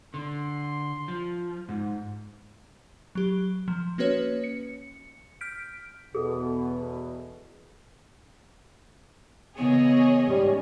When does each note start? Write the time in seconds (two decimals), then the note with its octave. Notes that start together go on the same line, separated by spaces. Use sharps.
0.14 D3 C6
1.08 F3
1.69 G#2
3.15 F#3 G4
3.68 F3
3.98 A#3 C#4 F#4 B4 C#5
4.44 C#7
5.41 F6 G6 B6 D7
6.15 E2 B2 G#4 A4
9.57 C#3 E3 A#3 B3 G#4 C#5 D#5
10.28 G#2 G3 C#4